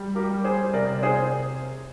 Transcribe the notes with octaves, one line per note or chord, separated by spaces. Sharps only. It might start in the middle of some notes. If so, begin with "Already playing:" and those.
Already playing: G3
G4 A#4
G3
G#4 C5
C3 A#4 D5
G#4 C5